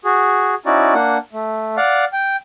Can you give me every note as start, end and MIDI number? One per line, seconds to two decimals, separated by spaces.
0.05 0.55 66
0.05 0.55 68
0.66 0.94 61
0.66 0.94 63
0.66 0.94 64
0.66 0.94 66
0.66 0.94 74
0.94 1.18 58
0.94 1.18 62
0.94 1.18 78
1.33 1.76 57
1.77 2.05 74
1.77 2.05 77
1.77 2.05 78
2.13 2.36 79